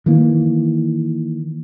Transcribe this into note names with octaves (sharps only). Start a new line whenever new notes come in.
D#3 E3 A#3